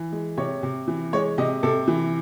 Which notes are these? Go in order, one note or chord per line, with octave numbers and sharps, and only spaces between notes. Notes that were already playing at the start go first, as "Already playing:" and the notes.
Already playing: E3
G#3
C3 C#5
C3
E3
G#3 C#5
C3 D#5
C3 A4
E3